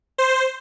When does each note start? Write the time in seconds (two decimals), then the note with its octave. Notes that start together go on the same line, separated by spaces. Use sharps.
0.18 C5